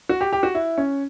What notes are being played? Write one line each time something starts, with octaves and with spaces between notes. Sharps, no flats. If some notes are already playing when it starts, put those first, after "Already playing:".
F#4
G4
G4
F#4
E4
C#4